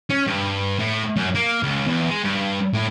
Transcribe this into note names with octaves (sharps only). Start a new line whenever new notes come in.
C#4
G2
A2
F#2
A#3
C#2
E2
G#3
G2
A2